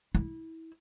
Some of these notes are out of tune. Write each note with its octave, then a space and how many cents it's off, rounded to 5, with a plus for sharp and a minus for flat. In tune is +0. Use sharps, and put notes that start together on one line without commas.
E4 -25